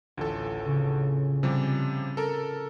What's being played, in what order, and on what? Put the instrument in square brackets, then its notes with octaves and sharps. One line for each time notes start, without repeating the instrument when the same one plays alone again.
[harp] A1 F4 G#6 [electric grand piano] D2 A4
[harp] C#3
[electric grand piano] C3 F3 G3 [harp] G#5 D6 A6
[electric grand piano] A4 A#4